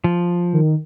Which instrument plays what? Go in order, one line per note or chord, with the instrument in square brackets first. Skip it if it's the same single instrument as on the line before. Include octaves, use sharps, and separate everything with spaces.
[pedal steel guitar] F3
[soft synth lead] D#3